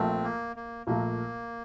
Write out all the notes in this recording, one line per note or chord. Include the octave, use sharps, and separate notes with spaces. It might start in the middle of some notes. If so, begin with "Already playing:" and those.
Already playing: A#1 A#2 A3 C4
A#3
A#3
A#1 A#2 A3 A#3